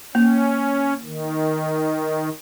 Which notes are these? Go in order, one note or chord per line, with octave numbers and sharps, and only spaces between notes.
A#3 C#4
D#3